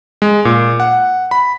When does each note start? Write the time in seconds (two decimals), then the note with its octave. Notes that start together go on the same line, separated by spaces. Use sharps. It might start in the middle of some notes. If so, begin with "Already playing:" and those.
0.22 G#3
0.45 A#2
0.80 F#5
1.31 B5